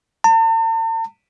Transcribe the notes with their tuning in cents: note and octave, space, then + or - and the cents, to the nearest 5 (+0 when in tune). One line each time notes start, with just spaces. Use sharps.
A5 +45